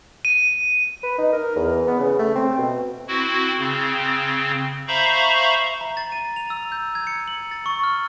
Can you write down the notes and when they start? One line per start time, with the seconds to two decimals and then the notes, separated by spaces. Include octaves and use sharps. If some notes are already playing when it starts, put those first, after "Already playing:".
0.25 D#7
1.03 B4
1.18 D#4
1.32 A#4
1.56 E2
1.87 B3
1.99 C#3
2.19 A3
2.35 C4
2.58 B2
3.08 C4 E4 F#4
3.59 C#3 C4
4.88 C5 E5 F5 A#5 B5 C#6
5.81 A#5
5.97 A6
6.12 D#7
6.36 F7
6.50 E6
6.72 G6
6.95 G#6
7.07 C#7
7.28 F#7
7.51 A6
7.66 C#6
7.83 F6